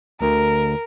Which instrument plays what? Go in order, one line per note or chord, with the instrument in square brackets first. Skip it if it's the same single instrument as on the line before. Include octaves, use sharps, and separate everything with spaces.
[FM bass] D2 [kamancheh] A#4